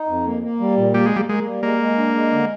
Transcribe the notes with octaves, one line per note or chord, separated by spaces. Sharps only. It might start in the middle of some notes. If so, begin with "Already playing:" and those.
Already playing: D#4
F2
A#3
A#3
G3
A#2
G3 A#3
G#3
G3 A#3
G#3 A#3
G3
G#3 A#3
G#3
D4
G#3
D3